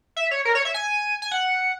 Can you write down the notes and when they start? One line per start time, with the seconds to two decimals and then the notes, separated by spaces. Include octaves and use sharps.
0.16 E5
0.31 C#5
0.45 A#4
0.55 C#5
0.65 E5
0.74 G#5
1.22 G#5
1.32 F#5